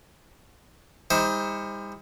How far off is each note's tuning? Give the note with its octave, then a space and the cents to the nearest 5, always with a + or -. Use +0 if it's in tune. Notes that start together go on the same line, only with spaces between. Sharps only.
G3 +45 D#4 +30 C5 +0